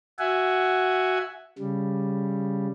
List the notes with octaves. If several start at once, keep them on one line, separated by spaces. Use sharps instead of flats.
F#4 E5 F#5 G#5
C#3 G3